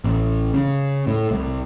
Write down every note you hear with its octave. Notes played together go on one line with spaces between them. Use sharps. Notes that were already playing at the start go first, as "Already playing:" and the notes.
A1
C#3
A2
C2